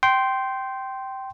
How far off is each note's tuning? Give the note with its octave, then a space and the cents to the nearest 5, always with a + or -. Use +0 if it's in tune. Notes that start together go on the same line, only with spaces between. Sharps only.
G5 -15 C6 +0